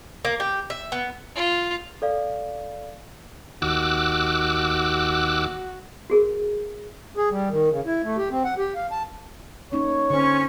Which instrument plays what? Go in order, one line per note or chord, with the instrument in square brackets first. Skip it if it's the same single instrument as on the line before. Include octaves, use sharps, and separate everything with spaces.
[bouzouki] A#3
G4
E5
B3
[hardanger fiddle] F4
[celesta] A4 D5 F5
[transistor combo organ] D#2 [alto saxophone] F#4 [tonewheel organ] D6 E6 F#6
[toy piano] F#4 G#4 A#4
[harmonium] G#4
G3
D#3
C#3
E4
A3
G4
C4
F#5
G4
F5
A5
[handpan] A#3 C#4 D#4 [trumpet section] C#5
[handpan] D3 C5 [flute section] C#4 [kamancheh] C#6